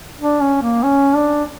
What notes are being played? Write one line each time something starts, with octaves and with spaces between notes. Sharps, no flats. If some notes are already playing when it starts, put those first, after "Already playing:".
D4
C#4
A#3
C#4
D4